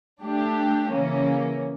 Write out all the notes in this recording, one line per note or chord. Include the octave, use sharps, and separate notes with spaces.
A3 D4 G4
C#3 E3 A#3 C#4